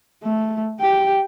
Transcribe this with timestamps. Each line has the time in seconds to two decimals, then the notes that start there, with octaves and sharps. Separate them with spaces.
0.24 A3
0.81 G4 G5